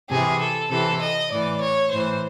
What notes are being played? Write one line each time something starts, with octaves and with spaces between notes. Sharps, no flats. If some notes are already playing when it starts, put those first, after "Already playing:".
C3 E3 G#4
A4
C3 E3 A4
D#5
A2 E3 D5
C#5
A2 E3 C5